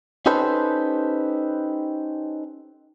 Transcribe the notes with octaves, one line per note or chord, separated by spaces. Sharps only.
C#4 D#4 G4 A4 B4 C5